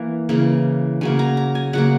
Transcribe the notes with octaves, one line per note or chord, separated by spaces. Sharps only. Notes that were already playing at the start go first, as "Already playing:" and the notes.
Already playing: E3 A#3
C#3 E3 A#3
C#3 F#3 A#3 G#5
A#5
A#5
G#5
C#3 F#3 A#3 F#5